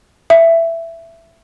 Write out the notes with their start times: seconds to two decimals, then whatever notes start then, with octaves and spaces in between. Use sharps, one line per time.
0.30 E5